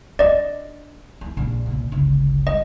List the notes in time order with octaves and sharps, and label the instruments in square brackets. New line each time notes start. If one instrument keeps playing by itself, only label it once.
[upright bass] D4 [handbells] D5 D#5
[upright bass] E4
A#1 F2
C2 A#2
G1 C#2
[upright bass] G3 [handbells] D#5